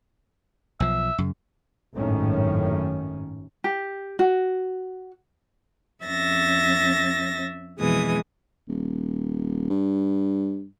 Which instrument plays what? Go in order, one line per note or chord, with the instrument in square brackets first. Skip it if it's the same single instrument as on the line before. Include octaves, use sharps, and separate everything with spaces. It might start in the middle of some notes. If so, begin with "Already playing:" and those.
[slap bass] B1 F3 [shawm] E5
[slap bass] F#2 C#3
[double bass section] G#1 F#2 A2 D#3 C#4
[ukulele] G4
F#4
[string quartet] F2 C#4 E5 A6 A#6
F2 B2 E3 G#3 G#5 D#6
[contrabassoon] D#1
G2